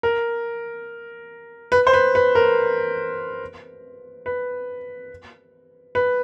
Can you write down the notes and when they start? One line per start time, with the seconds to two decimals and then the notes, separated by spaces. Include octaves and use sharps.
0.03 A#4
1.72 B4
1.87 C5
1.93 B4
2.15 B4
2.35 A#4
4.26 B4
5.95 B4